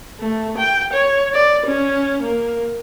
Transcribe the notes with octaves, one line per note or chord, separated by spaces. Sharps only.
A3
G5
C#5
D5
C#4
A#3